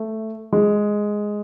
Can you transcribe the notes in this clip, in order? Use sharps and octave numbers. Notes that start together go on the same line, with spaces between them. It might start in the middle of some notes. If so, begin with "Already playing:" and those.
Already playing: A3
G#3